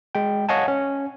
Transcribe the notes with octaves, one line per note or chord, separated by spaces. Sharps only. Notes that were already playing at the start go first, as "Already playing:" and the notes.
G#3 G5
C#5 D#5 F5 F#5 G#5 A5
C#4